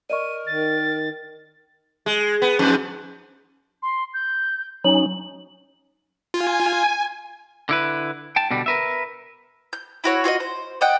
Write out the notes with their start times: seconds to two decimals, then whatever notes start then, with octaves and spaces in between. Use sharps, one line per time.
0.10 A#4 D5 D#5 C#6 D#7
0.47 D#3 A6
2.06 G#3
2.42 B3
2.59 F2 G#2
3.82 C6
4.14 G6
4.84 F#3 C#4 D#4 F#7
6.34 F4 G#5
7.69 D3 E4 B4
8.36 G5 A5
8.51 B2 D3 G3
8.66 A#4 B4 E5
9.73 G6
10.04 E4 F#4 C#5
10.24 F4 F#4 C#5 D#5
10.40 C5
10.81 D5 D#5 F#5 G5